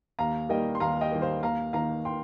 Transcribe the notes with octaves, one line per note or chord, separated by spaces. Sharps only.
D#2 F5 A#5
D#3 G3 A#3 D#5 G5
C6
D#2 F5 A#5
D#5 G5
D#3 G3 A#3
C5 F5
D#2 F5 A#5
D#3 A#3 F5 A#5
G5 C6